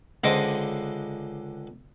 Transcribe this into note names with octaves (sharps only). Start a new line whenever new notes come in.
C#2 D3 C5 D#5 D6